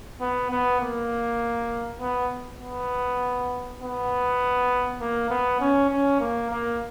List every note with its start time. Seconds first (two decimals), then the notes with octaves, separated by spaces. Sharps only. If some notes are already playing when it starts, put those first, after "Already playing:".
0.21 B3
0.51 B3
0.81 A#3
2.00 B3
2.61 B3
3.81 B3
5.01 A#3
5.30 B3
5.60 C#4
5.90 C#4
6.20 A#3
6.51 A#3